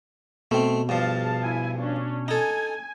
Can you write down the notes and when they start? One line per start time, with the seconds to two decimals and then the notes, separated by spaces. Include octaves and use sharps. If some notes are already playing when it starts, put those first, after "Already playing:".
0.51 B2 A3 C4
0.89 G2 F3 G#4 F5 A5
1.44 E4 G#5
1.80 C#4 D4
2.28 D#4 A4 G#5